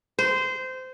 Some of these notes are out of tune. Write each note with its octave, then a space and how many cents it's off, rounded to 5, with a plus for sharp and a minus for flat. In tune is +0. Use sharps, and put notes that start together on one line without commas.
C5 -20